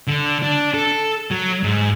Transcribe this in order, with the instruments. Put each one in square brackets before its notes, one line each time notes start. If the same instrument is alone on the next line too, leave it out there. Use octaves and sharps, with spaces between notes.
[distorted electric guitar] D3
D4
A4
F#3
G#2